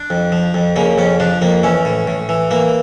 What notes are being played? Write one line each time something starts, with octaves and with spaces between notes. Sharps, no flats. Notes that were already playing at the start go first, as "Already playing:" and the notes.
Already playing: D4
F2
F3
F2
C#3 A#3
F2 C#4
F3 D4
F2 A#3
E3 C#4
A2
A2
E3
E3 A#3